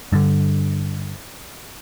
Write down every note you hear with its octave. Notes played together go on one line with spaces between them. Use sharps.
G2 D3